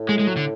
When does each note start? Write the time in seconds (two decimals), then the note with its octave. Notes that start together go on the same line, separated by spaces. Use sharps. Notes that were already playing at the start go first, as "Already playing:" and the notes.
Already playing: A2
0.09 G#3
0.19 G#3
0.27 F#3
0.37 D3